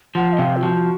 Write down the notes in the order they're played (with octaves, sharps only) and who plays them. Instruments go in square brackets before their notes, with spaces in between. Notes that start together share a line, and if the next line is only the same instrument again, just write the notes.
[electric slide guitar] F3 [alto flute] F#5
[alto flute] D#5
[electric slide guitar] C3 [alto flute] F5
[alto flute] F4
[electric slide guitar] F3 [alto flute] F#4